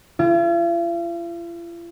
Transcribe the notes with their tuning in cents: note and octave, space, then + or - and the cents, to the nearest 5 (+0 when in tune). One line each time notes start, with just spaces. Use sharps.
F4 -45